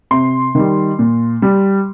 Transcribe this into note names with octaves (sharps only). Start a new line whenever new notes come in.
C3 C6
D#3 G3
A#2
G3